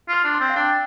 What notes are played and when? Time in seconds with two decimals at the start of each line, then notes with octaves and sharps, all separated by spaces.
0.09 F4 F6
0.24 D4
0.34 C6
0.40 C4
0.49 F5
0.56 D4 G5